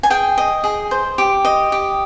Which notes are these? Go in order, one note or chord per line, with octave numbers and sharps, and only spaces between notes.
G#5
G#4 G5
D#5
G#4
C5
G4
D#5
G4